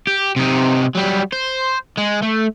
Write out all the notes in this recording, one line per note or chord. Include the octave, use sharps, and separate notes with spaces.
G4
C3 D#4
F#3 G3
C5
G#3
A3